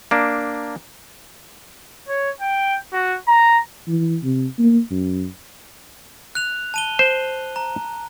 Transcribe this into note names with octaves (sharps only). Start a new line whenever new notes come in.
A#3 D4
C#5
G5
F#4
A#5
E3
C3
A#3
F#2
F#6 F7
A5 D#7 G7
C5
A#5